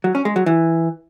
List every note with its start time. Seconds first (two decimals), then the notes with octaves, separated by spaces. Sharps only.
0.04 F#3
0.15 C#4
0.25 G#3
0.36 F#3
0.46 E3